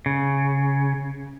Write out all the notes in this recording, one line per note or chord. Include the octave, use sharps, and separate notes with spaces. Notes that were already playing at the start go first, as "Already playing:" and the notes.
C#3